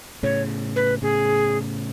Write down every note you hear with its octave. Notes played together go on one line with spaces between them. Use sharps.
A2 C#3 C#5
B4
A2 C#3 G#4